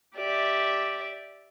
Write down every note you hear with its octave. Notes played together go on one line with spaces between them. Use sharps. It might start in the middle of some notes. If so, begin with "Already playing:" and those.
G4 D5 E5